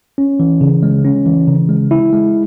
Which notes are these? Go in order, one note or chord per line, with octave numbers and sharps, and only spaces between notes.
C#4
E3
C#3
G#3
C#4
E3
C#3
G#3
E4
G#3